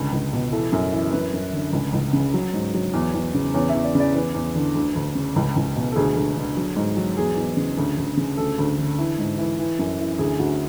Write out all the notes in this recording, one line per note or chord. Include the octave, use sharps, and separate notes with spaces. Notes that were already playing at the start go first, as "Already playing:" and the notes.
Already playing: C#2 D3
C#2
B2
E3 A4
F#2
E3
F#2 B4
F#2
D3
C#2
C#2
C#3
F#3
G#2
F#3
E2
E2
C#3
E2 C#5
E5
E2
D5
C#3
D5
E2 B4
E2
D3
D2
D2
C#3
C#2
C#2
B2
A4
D2 G#4
D2
D3
F#3
G#2
F#3
E2 G#4
E2
C#3
D2
D2
C#3
D2 A4
D2
D3
E3
G#2
E3
E3
F#2
E3
D2 G#4
D2 F#4